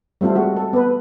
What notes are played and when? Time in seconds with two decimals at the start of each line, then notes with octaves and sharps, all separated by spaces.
0.21 G3 A3 C4 F4 A4
0.36 G#3 F#4
0.56 A4
0.73 B3 B4